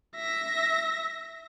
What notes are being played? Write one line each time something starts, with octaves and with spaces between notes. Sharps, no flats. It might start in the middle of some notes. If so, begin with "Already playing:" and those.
E5 A#6